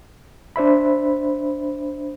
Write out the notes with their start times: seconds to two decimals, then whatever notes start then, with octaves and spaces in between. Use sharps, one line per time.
0.56 D4 C5 E5 B5